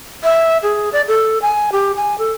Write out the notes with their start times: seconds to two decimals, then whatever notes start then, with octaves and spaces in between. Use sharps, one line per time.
0.24 E5
0.63 G#4
0.93 D5
1.08 A4
1.42 G#5
1.72 G4
1.96 G#5
2.18 A4